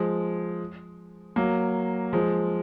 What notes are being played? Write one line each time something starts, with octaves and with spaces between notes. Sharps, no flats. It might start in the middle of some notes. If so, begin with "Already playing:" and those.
Already playing: F3 G#3
F#3 A#3
F3 G#3